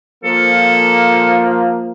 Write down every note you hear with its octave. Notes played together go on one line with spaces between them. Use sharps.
F3 A#3 A4